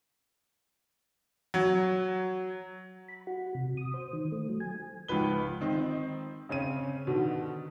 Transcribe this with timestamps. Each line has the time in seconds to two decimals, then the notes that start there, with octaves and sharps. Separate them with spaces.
1.54 F#3
3.09 B5
3.27 F#4
3.55 C3
3.77 D#6
3.94 C5
4.13 D#3
4.32 A3
4.49 F#3
4.60 G#5
5.08 C#2 G#2 F3 B4 G7
5.61 D#3 C4 D#5
6.49 C#3 C4 C#4 D#7
7.07 B2 D3 D#3